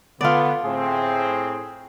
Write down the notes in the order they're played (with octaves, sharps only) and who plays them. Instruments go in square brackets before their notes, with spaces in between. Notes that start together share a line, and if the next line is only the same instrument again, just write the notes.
[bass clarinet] D3 [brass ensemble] B3 [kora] F4 D5
[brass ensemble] A2 C4 [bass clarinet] G#4